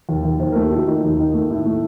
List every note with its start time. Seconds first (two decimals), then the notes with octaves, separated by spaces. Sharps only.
0.09 D#2
0.25 D#2
0.40 D#2 C5
0.52 A#4
0.56 A3
0.64 G4
0.71 D#3 F#4
0.87 D#3 D#4
1.03 D#2
1.19 D#3
1.34 A3
1.50 A2
1.66 A3